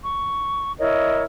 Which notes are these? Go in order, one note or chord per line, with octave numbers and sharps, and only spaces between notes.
C#6
E4 A#4 C#5 D#5